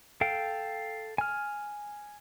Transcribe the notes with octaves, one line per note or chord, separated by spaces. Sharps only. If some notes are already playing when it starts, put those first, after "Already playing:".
A4 F5 G5
G#5 F6